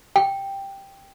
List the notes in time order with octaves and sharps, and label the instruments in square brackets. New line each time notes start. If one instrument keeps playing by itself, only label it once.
[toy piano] G5